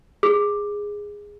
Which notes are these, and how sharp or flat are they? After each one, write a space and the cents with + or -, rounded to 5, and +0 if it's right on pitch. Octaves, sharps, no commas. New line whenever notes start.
G#4 -10